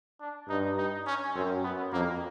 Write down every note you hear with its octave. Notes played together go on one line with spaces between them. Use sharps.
D4
G2 D#4
D#4
C#4
F#2 C4
B3
F2 A#3